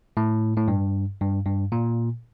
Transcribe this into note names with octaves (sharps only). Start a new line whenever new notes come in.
A2
A2
G2
G2
G2
A#2